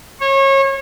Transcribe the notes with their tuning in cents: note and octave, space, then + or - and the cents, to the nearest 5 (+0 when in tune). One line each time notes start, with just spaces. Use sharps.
C#5 -30